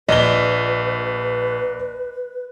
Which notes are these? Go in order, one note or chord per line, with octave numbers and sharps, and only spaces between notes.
A#1 B4 D5 D#5 G7